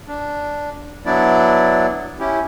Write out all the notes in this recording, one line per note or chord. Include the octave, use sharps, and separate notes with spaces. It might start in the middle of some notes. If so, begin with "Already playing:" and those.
D4
F#3 B3 D4 E4 D5
C#4 E4 G4